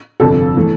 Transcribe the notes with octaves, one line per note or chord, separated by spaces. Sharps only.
G1 F2 C3 F3 A4
E3 A3